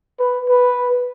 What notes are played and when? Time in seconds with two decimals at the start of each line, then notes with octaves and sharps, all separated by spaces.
0.19 B4
0.49 B4